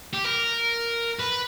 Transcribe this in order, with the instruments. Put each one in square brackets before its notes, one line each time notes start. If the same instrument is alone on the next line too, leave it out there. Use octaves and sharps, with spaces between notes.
[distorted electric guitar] G4
A#4
B4